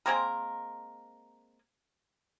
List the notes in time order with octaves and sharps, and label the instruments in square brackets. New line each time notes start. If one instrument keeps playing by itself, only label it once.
[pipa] G#3 A#3 C4 A#4